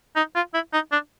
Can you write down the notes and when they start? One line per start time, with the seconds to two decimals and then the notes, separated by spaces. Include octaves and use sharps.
0.16 D#4
0.35 F4
0.54 E4
0.73 D#4
0.92 D4